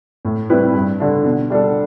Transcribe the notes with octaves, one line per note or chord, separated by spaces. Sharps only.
A2
G3 C4 E4 B4
G2
D3 G3 D4
B2
G3 D4 A4